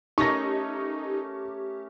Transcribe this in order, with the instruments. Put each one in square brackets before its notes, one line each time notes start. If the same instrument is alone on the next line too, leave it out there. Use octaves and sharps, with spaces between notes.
[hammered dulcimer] A3 C#4 A#4 [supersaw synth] D#4 [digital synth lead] G4 [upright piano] C#6 A#6